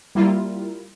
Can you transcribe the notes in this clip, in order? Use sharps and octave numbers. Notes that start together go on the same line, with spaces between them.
G3 A#3 E4 F4